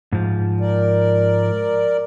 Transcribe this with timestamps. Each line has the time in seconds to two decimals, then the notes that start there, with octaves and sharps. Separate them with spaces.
0.12 G#2 F3
0.60 A#4 D5